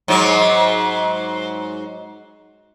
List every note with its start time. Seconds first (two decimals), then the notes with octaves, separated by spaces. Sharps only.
0.08 G#2 F#3